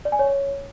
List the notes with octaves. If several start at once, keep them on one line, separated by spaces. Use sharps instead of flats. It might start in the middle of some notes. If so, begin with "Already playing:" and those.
D5
G#5
C#5